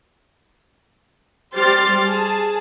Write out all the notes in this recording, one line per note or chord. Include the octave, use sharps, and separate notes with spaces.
G3 G4 C5 C6 F6 A6
G#4 A5